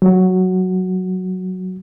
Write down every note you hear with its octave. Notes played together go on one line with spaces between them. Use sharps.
F#3 F#4